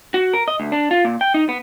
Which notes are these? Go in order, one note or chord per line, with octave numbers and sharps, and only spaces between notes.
F#4
A#4
D#5
D2
D4
F4
A#2
G5
D#4
B3